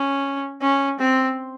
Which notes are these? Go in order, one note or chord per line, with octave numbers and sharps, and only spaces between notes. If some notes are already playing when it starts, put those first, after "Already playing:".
Already playing: C#4
C#4
C4